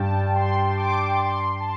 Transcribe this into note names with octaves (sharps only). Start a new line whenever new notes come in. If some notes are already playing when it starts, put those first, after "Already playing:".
Already playing: G2 G5 A5
C6
D6
C6
A5